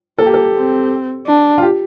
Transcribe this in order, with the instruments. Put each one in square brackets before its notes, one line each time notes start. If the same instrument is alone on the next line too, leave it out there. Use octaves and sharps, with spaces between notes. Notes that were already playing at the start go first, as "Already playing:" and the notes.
[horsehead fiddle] A#3 [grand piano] A4
[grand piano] G4
A4
[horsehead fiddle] C4
D4
[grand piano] F4
G4